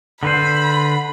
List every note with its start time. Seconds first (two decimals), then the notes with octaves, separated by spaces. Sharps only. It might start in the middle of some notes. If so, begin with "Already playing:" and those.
0.23 D3 B4 C5 B5